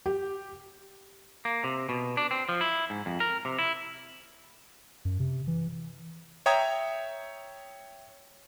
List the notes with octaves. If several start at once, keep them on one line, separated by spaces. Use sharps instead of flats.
G4
A#3
C3
B2
D4
C4
F3
E4
G#2
F2
A#4
C3
E4
F#2
C3
E3
C#5 E5 G5 A#5 D#6 G#6